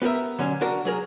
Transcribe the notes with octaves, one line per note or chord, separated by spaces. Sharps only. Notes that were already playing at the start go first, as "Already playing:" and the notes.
B3 G4 G#4 A#4 E5
D3 F#3 C#4
D4 F#4 A#4
F#3 G#4 A#4